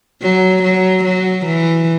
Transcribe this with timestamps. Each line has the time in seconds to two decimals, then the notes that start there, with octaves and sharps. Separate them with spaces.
0.22 F#3
0.63 F#3
1.04 F#3
1.46 E3